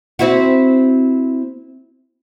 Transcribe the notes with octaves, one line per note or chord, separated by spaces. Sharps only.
C4 E4 F#4